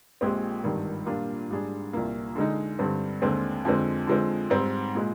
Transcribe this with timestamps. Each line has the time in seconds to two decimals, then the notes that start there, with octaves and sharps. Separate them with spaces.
0.21 A#1 A#2 G#3 C4 G4
0.64 G#1 G2 D#3 G3
1.06 A#2 G3 A#3 D4 F4
1.50 G#2 G3 D4 G#4
1.93 C2 A#2 F3 A#3
2.36 D3 G#3 D#4
2.79 G2 D3 G3 C4
3.22 D#2 D3 G#3 C4
3.65 F2 D3 G#3 C4
4.07 D3 F3 G#3 C4
4.50 G#2 G3 C4
4.95 A#2 G#3